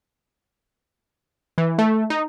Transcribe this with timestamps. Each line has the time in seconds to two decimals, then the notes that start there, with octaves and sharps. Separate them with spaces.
1.58 E3
1.78 A3
2.10 D#4